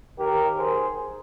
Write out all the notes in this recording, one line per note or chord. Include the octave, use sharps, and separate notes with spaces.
D#2 D#3 G4 A#4
G#4 C5